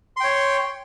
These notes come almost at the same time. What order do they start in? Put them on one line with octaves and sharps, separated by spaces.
C6 G5 C#5